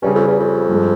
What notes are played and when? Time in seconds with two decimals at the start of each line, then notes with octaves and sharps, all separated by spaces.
0.02 G2 C#3 G3 C#4
0.15 F2
0.28 E2
0.40 F2
0.69 G2 F3 G#3